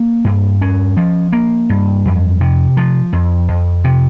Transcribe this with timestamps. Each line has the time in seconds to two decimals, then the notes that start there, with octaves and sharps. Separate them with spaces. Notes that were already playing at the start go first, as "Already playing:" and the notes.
Already playing: A#3
0.25 G2
0.61 C#4
0.97 F3
1.32 A#3
1.69 G2
2.05 F2
2.41 C3
2.77 F3
3.13 F2
3.49 F2
3.84 C3